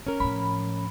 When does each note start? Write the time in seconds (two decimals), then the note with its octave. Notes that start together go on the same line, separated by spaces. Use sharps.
0.07 C#4 A#4
0.20 A2 F3 B5